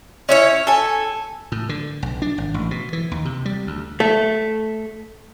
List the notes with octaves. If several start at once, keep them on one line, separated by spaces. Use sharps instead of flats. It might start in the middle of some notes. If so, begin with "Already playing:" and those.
C#4 E4 C#5
A4 G#5
A2
D3
B1
D4
G#1
A1
B2
E3
D#2
C3
G3
D2
A3